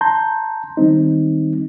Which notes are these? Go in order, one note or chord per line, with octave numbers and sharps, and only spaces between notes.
A5 A#5 C6 G6
D#3 G3 C4 D#4